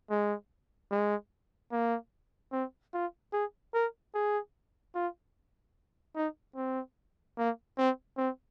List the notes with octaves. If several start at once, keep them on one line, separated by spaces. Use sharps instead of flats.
G#3
G#3
A#3
C4
F4
G#4
A#4
G#4
F4
D#4
C4
A#3
C4
C4